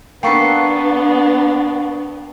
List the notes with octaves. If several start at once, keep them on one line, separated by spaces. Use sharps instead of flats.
A#3 B3 D4 A4 B4 G5 C#6 C7